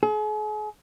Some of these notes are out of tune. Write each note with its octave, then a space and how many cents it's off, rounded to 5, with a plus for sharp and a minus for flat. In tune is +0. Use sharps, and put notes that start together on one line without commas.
G#4 +40